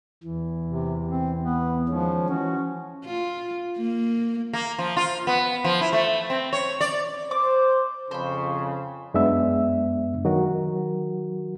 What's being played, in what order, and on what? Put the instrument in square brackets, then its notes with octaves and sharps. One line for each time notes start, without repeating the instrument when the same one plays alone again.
[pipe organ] E2 E3
[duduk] C3
C4
B3
[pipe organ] D#3 G#3 C#4 [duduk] F3
[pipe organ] E3 F#4 [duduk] C#4
[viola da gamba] F4
A#3
[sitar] A#3
F3
F4
B3
F3
E4
A3
C4
C#5
D5
[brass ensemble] C5 [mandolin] D6
[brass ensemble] F2 C#3 [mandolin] C5 B5
[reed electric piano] F#2 G#3 B3 D4 E5 E6
D#3 F#3 F#4 A#4